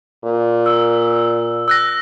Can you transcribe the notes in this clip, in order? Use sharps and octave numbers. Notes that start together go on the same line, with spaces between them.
A#2
E6
E6 F#6 A#6